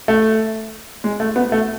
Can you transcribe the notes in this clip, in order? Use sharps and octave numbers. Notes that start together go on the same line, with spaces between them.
A3
G#3
A3
B3
A3